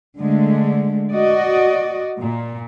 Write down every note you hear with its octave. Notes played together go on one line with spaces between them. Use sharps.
D3 G#3 A3
F#4 D5 D#5
A#2